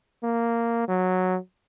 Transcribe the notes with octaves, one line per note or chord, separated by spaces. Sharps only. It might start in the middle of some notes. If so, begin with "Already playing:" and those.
A#3
F#3